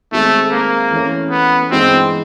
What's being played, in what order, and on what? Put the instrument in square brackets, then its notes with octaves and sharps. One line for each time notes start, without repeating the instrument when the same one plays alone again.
[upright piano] D#3 G#3 C4 [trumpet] A3
[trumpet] A#3
[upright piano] E3 A3 C#4
[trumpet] B3
[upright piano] G2 E3 G#3 B3 D#4 [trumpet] C4